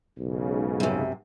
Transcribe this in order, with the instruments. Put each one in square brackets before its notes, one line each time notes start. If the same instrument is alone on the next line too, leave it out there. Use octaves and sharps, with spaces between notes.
[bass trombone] B1 [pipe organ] G#2 C#3
[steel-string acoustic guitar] F#2 C3